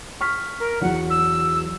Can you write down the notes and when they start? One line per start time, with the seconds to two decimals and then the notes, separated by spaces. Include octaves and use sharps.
0.21 C#6 F6 B6
0.59 A#4
0.81 E2 F#3 F#5
1.10 E6